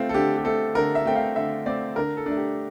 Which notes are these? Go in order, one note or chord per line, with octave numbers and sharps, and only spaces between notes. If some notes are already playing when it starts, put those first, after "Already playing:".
Already playing: A3 C4 F4
A4
D3 G4
G4
A3 C4 A4
D3 A#4
E5
A3 C4 G5
F5
D3 E5
A3 C4 D5
D3 A#4
A4
A3 D4
G4